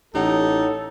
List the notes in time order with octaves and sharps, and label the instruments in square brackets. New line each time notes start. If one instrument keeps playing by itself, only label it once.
[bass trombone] A1 [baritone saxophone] D#4 [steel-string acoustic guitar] G4 C#5 F#5 [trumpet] A4